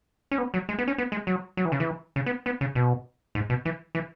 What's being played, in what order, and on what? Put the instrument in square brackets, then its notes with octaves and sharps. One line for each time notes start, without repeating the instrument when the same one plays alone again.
[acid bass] C#4
B3
F#3
G#3
B3
C#4
B3
G#3
F#3
F#3
E3
C#3
E3
C#3
B3
B3
C#3
B2
G#2
B2
E3
E3